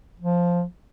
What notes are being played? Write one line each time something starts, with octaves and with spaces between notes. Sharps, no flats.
F3